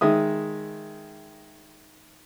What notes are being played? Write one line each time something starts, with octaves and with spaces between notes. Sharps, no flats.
D#3 G#3 E5 D#6